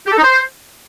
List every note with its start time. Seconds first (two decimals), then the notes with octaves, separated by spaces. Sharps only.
0.07 G4
0.12 A4
0.18 D#4
0.23 C5